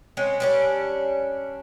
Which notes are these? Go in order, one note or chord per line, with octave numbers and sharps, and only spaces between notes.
G#3 C4 C#4
G3 C#4 D4